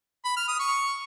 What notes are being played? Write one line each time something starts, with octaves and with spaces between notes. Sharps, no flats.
B5
F6
D#6
C#6